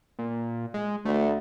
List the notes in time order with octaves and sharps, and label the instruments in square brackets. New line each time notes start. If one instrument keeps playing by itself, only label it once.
[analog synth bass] A#2
G#3
[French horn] D2 [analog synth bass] A3